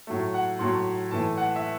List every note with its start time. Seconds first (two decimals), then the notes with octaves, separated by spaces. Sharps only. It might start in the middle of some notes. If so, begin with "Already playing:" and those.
0.07 A2 F#3 A3
0.34 F#5
0.59 A2 F#3 A3 C6
1.11 A2 E3 A3 A5
1.38 F#5
1.56 E5